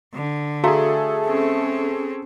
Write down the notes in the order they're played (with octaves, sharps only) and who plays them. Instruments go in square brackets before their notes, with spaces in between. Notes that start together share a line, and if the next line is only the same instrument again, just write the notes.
[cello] D3
[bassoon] A3 [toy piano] F#4 F5 A#5 [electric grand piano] G#4 A4
[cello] C4 C#4